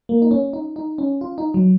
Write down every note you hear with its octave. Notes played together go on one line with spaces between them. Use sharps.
A#3
D#4
C#4
D#4
D#4
C#4
F4
D#4
F#3